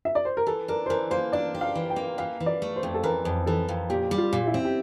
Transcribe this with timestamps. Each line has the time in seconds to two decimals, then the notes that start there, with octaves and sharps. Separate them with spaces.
0.05 E5
0.15 D5
0.25 C5
0.37 A#4
0.47 E3 A4
0.68 D4 A#4
0.86 C5
0.89 E3 A#4
1.11 A#3 C5
1.32 D4 D5
1.55 G4
1.61 F5
1.75 E3
1.90 G5
1.96 A#3
2.18 E3 F5
2.40 E3
2.46 D5
2.62 A3
2.76 C5
2.83 F2
2.94 A4
3.04 E3 A#4
3.25 F2
3.46 E3 A4
3.69 F2
3.90 A#2 G4
4.11 G3
4.18 F4
4.33 A#2
4.47 E4
4.54 C4
4.65 G4